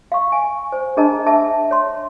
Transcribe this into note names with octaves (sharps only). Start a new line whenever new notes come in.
F5 C#6
G#5
C5
D4 G#4 A#4 D#5 A5 A#5
G#4 E5 A5 E6
C#5 C6